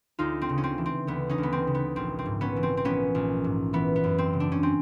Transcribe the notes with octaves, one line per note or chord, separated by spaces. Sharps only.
D2 D#4 F4
C4
C#3
C#4
C4
E3
C4
D2 B3
C#4 D#4
D2
B3
C4
C#3
B3
A#1 C4
C4
G#2
B3 C#4
E3
C4
C4
A#1 B3 C#4
A#1
G#2
E3 B3
B3
F#2
C4
C#3
D4
C#4
C4